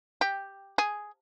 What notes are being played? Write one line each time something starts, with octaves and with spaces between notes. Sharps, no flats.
G4
G#4